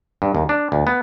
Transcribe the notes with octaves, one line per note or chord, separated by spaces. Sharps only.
G2
D#2
D4
D2
B3